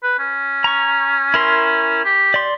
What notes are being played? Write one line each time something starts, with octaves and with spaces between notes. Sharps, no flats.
B4
C#4
A#5 C#6
E4 A#4 C6
G4
D5 C6